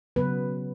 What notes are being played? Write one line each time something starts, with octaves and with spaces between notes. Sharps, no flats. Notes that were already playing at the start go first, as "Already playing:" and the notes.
C#3 F#3 B3 B4